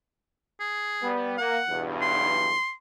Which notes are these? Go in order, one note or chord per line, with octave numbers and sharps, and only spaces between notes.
G#4
G3 B3
A#3 F#5
B1 E2 G2
C6